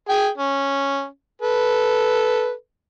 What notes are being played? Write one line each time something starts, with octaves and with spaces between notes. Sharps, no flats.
G#4 G5 G#5
C#4
A4 B4